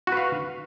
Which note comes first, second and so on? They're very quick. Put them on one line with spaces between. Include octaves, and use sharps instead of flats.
F#4 B4 F5